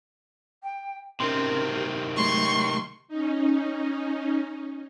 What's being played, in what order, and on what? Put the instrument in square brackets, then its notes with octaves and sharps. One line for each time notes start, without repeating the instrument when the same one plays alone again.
[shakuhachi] G5
[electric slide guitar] C3 D#3 C4 [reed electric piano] C#4 C6 [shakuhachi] A#4
[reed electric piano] G4
[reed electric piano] F#3 G#3 A3 [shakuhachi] C#5 [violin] C6 C#6
[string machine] C#4 D#4